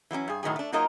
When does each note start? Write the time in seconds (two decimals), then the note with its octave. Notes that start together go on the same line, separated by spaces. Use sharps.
0.11 E3 F#3 A#3 C#4
0.28 G2 G#4
0.43 A2 D#3 F#3 G#4
0.56 A3 D4
0.72 F#3 A#3 D#4 F4 A#4 D#5